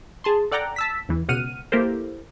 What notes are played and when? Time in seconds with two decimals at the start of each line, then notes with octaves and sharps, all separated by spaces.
0.24 G#4 A5 C6
0.51 A4 D5 F#5 G5 A#5 D6
0.76 A5 E6 B6
1.09 E2 E3
1.29 C#2 B2 F#5 F6 D#7
1.72 A#3 E4 G4 A4 A#4 C5